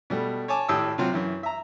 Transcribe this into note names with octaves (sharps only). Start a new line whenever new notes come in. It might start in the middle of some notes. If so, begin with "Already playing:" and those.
B2 G3 A3
C#5 G#5 A5 D6
G#1 A2 G4 G5 D#6 E6
C3 F#3 C4 F4 F#4
F#2 E3
E5 A#5